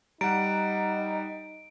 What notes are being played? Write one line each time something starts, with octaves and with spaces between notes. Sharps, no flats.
G3 D#4 F#5 A#5 D7